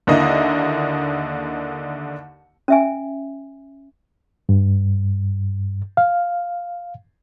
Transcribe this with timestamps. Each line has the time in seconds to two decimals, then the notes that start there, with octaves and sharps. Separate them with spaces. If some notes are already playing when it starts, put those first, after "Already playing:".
0.07 D#2 D3 A#3 E4 D#5
2.68 C#4 E5 G#5
4.49 G2
5.97 F5